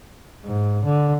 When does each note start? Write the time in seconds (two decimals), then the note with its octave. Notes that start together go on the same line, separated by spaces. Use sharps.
0.44 G#2
0.84 D3